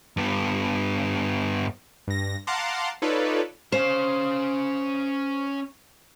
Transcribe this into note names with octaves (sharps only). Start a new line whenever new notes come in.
G2 B3
G2 A#6
F5 F#5 A5 A#5 C6 D6
D#4 F4 A4 B4 C#5 D5
C#4 C5 F5